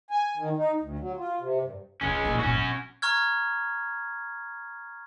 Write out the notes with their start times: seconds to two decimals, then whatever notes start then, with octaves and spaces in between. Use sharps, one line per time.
0.11 G#5
0.37 D#3
0.57 D#4
0.80 D2
0.99 F#3
1.17 F4
1.40 C3
1.62 G2
2.01 D1 A1 G#3 C#4
2.25 A#1 D#4
2.39 G1 A#2 C#4 F#4
2.55 B2
3.02 A#5 C#6 F6 G#6